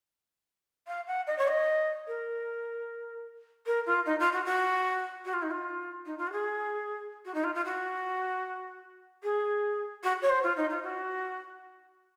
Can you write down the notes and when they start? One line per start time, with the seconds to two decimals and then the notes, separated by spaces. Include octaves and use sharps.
0.87 F5
1.07 F#5
1.27 D#5
1.38 C#5
1.47 D#5
2.07 A#4
3.66 A#4
3.86 F4
4.05 D#4
4.19 F4
4.32 F#4
4.45 F#4
5.25 F#4
5.33 F4
5.42 D#4
5.51 F4
6.05 D#4
6.18 F4
6.27 F#4
6.32 G#4
7.25 F#4
7.34 D#4
7.44 F4
7.54 F4
7.65 F#4
9.23 G#4
10.03 F#4
10.22 C#5
10.29 C5
10.43 F4
10.56 D#4
10.70 F4
10.83 F#4